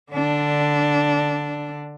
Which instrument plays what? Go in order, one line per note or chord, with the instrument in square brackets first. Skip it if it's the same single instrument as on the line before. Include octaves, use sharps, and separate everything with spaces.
[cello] D3 D4